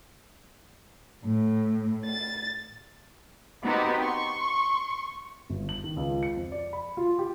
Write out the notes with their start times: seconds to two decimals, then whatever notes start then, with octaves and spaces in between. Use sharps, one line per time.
1.25 A2
2.05 A6
3.63 B3 C4 D#4 F#4 G4
4.01 C6 C#6
5.50 G1
5.69 F#7
5.84 D#3
5.97 C#2
6.23 C#7
6.36 F2
6.52 D5
6.73 B5
6.97 F4
7.19 G4